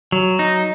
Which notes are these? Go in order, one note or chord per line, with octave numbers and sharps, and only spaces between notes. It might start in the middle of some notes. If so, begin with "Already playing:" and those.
F#3
D#4